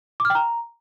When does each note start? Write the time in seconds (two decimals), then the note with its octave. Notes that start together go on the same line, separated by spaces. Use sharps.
0.20 D6
0.25 F6
0.30 G5
0.35 A#5